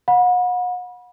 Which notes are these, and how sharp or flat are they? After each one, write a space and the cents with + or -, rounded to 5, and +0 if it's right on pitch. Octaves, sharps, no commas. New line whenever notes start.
F#5 -40 B5 -25